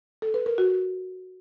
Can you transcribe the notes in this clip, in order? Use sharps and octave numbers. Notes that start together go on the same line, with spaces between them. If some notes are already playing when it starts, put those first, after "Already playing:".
A4
B4
A#4
F#4